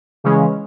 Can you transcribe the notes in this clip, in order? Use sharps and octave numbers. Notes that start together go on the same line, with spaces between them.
C#3 E3 G#3 C#4